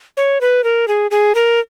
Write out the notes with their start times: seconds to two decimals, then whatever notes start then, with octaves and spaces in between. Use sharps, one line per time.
0.17 C#5
0.41 B4
0.64 A#4
0.88 G#4
1.11 G#4
1.35 A#4